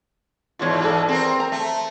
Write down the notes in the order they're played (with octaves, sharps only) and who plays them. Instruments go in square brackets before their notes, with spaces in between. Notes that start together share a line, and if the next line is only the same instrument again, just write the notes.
[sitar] E2 G#2 B2 [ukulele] F4 C#5
[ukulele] G#4 A4 D5
[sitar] C4 A#4
[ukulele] A#5
[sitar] A3